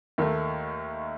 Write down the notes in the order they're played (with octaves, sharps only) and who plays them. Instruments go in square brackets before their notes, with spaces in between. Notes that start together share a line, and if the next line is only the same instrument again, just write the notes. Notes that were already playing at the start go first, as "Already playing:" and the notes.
[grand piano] D#2 D#3 A3